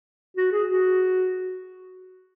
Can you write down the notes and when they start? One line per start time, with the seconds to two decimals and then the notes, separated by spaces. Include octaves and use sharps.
0.37 F#4
0.52 G#4
0.69 F#4